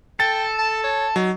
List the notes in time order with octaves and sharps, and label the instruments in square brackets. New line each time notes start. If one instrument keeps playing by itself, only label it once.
[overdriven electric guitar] A4 [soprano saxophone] G5 [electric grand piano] A6
[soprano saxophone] A5
C#5
[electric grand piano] F#3 [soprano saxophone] D#4